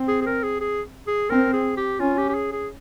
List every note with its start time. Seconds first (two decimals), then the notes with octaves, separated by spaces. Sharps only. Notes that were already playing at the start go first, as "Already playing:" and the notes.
Already playing: C4
0.08 G#4
0.22 G#4
0.26 A#4
0.43 G#4
0.61 G#4
1.07 G#4
1.30 C4 A#4
1.53 G#4
1.77 G4
1.99 C#4 F4
2.18 G4
2.29 G4
2.35 G#4
2.52 G#4